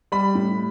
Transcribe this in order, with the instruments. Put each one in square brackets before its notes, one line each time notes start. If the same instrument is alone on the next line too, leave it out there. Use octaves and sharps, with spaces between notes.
[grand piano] G3 B5
A2